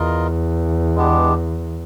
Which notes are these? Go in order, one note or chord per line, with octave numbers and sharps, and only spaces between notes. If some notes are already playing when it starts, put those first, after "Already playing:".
Already playing: E2 F4 A#4 D#5
G#3 B3 D4 G4